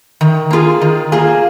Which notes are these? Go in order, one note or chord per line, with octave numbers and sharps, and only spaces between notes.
D#3
A#3 F4 G#4
D#3
A#3 F4 G#4